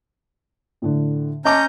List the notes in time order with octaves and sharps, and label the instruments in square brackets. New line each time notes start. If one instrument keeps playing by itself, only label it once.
[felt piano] A2 D3
[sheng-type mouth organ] C#4 A#5 G6 [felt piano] D#5 A5 D6